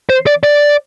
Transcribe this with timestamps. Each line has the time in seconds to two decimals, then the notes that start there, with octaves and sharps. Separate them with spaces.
0.09 C5
0.26 D5
0.43 D5